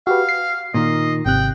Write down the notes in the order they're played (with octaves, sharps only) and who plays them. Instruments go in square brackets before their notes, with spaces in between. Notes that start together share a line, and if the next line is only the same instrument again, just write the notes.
[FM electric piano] F#4 G4 B4 [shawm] F5
[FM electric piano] C7
[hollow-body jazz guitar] A#2 D#3 [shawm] D#5
[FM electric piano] G#1 C3 F#6 [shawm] G5